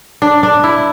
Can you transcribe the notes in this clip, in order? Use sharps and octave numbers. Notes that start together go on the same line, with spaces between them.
D4
D4
E4